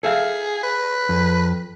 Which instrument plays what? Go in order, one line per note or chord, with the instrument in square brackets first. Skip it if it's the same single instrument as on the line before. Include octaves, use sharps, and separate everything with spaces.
[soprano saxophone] G#4 [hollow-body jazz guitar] A4 E5 F5
[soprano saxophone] B4
[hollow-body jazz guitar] F2